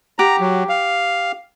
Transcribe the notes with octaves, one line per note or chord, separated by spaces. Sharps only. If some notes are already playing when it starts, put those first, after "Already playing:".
G4 F#5 A#5
F#3
F5